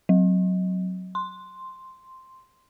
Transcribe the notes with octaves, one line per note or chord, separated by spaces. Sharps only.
F#3
C6